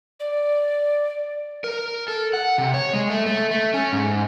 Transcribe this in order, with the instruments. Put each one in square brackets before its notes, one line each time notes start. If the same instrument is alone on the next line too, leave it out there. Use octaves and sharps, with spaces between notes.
[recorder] D5
[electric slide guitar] A#4
A4
F#5
C3
C#5
G#3
A3
A3
A3
C#4
G#2